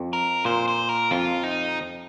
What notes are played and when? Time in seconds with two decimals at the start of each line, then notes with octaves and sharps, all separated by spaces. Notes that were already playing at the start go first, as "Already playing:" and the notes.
Already playing: F2
0.13 A#4
0.45 A#2 C5
0.68 C5
0.89 A#4
1.11 F2 F4
1.44 D#4